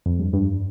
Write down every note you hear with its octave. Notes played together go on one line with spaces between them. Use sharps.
F2
G2
G2